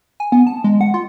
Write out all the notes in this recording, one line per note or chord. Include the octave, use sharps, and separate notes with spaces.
G#5
B3
A5
G#3
F#5
F4